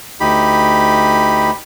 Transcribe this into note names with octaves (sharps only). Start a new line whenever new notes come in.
D2 D#4 G4 B5